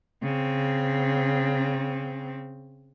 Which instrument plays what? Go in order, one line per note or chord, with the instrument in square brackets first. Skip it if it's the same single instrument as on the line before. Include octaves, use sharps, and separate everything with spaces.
[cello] C#3 C4